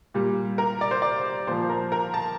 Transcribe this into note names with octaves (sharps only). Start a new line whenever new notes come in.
A#2 G3
A#4
D5
C5
D5
A#2 F3 C5
A#4
A#4
A5